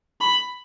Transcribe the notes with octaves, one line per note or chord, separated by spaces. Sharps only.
B5